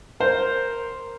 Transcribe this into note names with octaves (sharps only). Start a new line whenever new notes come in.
A#4 C5